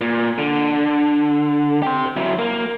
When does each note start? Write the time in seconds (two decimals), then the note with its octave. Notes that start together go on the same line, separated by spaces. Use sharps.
0.01 A#2
0.38 D3
1.82 G4 C5
2.17 F#3 E4
2.39 A#3